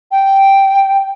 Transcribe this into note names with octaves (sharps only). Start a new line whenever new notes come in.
G5